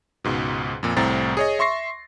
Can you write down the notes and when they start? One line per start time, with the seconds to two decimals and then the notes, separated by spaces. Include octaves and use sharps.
0.24 C#2 G#2 B2
0.83 F2 A#2
0.96 C2 A2 C4 A#5 A6
1.37 G#4 C#5 D#5
1.59 E5 C6 C#6 A#6 C7